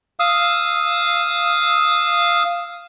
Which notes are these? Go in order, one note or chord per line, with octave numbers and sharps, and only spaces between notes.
F5 D#6 E6